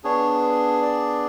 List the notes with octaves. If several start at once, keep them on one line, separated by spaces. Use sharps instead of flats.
B3 D4 G#4 C#5
D5